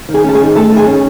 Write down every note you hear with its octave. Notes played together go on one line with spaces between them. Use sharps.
D#3
G#4 G#5
C#4 A5
G#4 G#5
D#3
A3 A4 A5
D#3 G#4 G#5
C#4